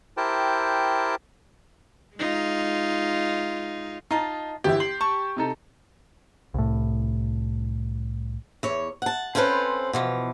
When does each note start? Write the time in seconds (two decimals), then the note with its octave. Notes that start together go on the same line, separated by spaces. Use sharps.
0.17 E4 G4 A#4 C5 G5 A5
2.16 G#3 D#4 F4
4.11 D#4 F4 D#5 A5
4.64 G1 E3 E4 G4
4.80 C6 F#7
5.01 A5 C#6
5.37 C3 D#4 A4
6.54 C2 A2
8.63 E2 C#5
9.02 F#5 A5
9.35 C4 C#4 F4 A4 B4 C5
9.93 B2 E3 F3